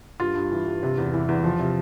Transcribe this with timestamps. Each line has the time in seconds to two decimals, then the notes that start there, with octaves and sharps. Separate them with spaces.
0.20 G2 F4
0.35 G2
0.52 E3
0.66 G2
0.83 C3
0.98 E2
1.14 E3
1.29 E2
1.44 F3
1.59 C3